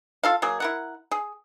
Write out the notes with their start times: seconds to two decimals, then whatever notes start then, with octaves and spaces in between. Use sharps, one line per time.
0.23 F4 A4 F5
0.42 F#3 A#3 G#4
0.60 E4 A#4 F#5
1.11 G#4